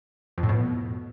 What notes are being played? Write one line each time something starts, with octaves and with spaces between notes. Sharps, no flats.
F2
A2
B2